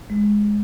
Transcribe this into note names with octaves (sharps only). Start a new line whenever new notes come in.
G#3